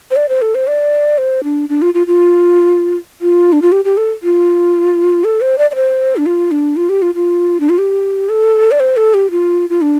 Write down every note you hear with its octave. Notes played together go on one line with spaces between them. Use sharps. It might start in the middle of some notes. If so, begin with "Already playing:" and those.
C5
D5
C5
A4
C5
D5
C5
D4
D4
F4
F4
F4
F4
D4
F4
G4
G4
A4
F4
A4
C5
D5
D5
C5
D4
F4
D4
F4
G4
F4
F4
D4
F4
G4
A4
D5
C5
A4
G4
F4
F4
D4